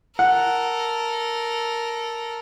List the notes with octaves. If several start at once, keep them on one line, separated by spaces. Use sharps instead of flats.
A4 A#4 F#5